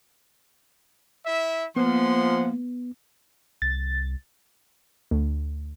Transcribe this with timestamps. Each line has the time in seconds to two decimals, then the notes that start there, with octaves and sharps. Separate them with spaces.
1.26 E4 E5
1.76 F3 G#3 A#3 B3 F#5 C6
3.62 C2 A6
5.11 D2